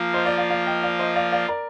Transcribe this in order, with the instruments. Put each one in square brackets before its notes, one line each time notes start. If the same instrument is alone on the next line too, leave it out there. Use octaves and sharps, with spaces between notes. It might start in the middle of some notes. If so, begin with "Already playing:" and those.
Already playing: [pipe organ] F3 A#3 F4
[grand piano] C5 D#5
D5 F5
D5 F5
D5 F5
D#5 G5
D5 F5
C5 D#5
D5 F5
D5 F5
A#4 D5